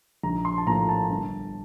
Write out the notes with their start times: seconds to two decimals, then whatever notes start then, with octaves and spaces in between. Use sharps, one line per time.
0.23 A#1 A#5
0.45 C6
0.58 A5
0.66 A2 F3 A#3 A#5
0.89 A5
1.09 G1